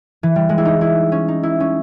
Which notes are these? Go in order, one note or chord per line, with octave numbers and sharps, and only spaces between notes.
E3
G3
G#3
E4
D#4
E4
C#4
D#4
E4
C#4